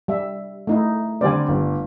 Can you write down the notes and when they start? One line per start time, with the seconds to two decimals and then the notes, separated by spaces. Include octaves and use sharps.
0.08 G3 E5
0.67 A3 D#4 E4
1.21 D3 G3 C4 D5 G#5
1.48 G1